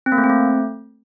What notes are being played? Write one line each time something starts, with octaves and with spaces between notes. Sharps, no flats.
C4
A#3
A3
C4
A3